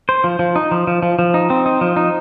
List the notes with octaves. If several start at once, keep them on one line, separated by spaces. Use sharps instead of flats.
C5
F3
F3
D#4
F3
F3
F3
F3
D#4
C4
D#4
F3
D#4